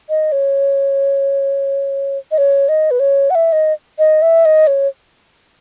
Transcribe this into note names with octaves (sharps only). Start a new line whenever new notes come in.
D#5
C#5
D#5
C#5
D#5
B4
C#5
F#5
E5
D#5
D#5
E5
D#5
C#5